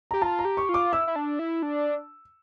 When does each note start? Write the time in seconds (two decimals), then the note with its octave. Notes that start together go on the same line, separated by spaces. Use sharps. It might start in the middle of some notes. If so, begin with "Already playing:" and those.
0.11 G4 A#5
0.22 F4 A5
0.39 A#5
0.45 G4
0.57 C#6
0.69 F4
0.74 D6
0.92 E4 E6
1.07 E4
1.16 D4
1.39 E4
1.63 D4